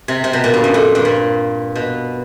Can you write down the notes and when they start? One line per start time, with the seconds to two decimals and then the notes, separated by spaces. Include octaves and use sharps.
0.08 C3
0.24 C3
0.33 B2
0.44 A#2
0.54 G2
0.64 F#2
0.74 F2
0.95 G2
1.05 A#2
1.75 B2